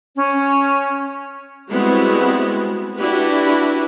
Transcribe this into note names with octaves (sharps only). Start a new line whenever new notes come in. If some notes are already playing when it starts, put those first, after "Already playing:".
C#4
G3 G#3 B3 C4 E4 F#4
D4 E4 F#4 G4 B4